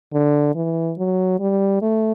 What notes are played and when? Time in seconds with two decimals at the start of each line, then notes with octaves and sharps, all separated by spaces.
0.13 D3
0.55 E3
0.98 F#3
1.40 G3
1.82 A3